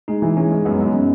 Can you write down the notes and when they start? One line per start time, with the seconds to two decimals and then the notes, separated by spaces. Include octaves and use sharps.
0.08 G#3 D#4
0.22 E3
0.37 G#3 C#4
0.52 G#3
0.65 F#2 B3
0.81 F#2